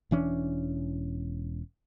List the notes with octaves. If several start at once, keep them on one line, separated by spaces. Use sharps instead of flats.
E1 E3 C#4 D4